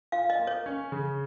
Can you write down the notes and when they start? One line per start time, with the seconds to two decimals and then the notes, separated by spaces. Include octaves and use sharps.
0.12 F4 F5
0.30 D#5
0.39 A#3
0.47 C#5
0.66 C#4
0.92 C#3